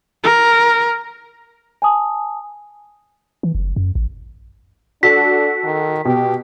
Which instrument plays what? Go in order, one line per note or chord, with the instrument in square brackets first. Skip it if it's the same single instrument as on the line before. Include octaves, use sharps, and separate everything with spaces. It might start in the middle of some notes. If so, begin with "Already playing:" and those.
[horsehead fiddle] A#4
[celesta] G#5 A5 D#6
[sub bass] E3
F#1
F#2
A1
[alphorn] D4 [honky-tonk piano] F#4 A4 [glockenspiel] B6
[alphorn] D#3
[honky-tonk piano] B2 [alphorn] G4